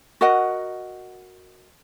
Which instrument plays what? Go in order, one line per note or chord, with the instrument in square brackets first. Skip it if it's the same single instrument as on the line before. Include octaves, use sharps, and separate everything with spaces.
[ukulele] F#4 A#4 D#5 F#5